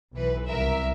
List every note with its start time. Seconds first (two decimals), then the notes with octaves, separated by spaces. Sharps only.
0.14 B1 E3 B4
0.48 C2 A#4 E5